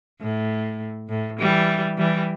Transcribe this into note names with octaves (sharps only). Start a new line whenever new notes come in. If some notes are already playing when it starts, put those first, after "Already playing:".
A2
A2
E3 G3
E3 G3